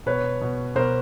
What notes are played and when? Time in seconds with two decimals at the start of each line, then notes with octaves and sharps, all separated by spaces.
0.06 B2 B4 C#5
0.41 B2
0.75 B2 A#4 C5